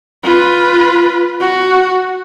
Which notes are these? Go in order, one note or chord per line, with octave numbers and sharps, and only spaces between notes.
F4 B4
F#4